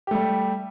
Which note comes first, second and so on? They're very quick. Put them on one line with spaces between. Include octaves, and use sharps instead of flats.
G4 A3 G3